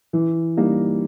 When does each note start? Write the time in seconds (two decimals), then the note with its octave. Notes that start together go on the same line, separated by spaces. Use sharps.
0.13 E3
0.57 G3 A#3 D#4